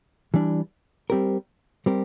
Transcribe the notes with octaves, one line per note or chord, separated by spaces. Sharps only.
E3 G3 D4
G3 C4 G4 A#4
G3 C4 G4 A#4